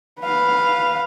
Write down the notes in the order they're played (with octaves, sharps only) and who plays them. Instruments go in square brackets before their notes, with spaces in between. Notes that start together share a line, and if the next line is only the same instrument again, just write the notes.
[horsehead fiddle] B4 F5